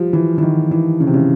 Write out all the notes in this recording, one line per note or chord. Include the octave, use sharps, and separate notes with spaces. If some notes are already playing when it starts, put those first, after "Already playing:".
Already playing: F3 G3
E3
E3
D#3
E3
C#3
C3
C#3